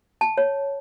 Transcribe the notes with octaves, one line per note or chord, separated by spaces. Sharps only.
A5
C#5